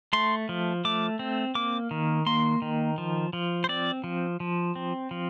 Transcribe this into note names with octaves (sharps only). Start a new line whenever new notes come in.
A3 C6
F3
A3 D6
C4
A#3 D6
D#3
A#3 C6
D#3
F3
F3
C5
C4 D5
F3
F3
C4
F3